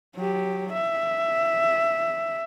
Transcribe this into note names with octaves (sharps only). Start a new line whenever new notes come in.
F#3 G4
E5